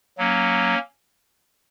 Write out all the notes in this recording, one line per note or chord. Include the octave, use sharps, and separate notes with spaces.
F#3 A#3 C#4